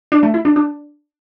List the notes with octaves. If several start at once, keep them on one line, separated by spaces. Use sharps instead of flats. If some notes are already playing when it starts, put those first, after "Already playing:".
D4
A3
E4
D4
D4